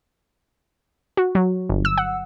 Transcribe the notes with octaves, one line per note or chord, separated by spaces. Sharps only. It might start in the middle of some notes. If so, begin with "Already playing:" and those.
F#4
F#3
G1
E6
F#5